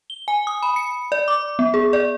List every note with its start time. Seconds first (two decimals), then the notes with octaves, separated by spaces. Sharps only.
0.10 G7
0.28 G#5
0.47 D#6
0.63 B5
0.76 C#7
1.12 D5
1.28 D6
1.59 B3
1.74 G#4
1.93 D5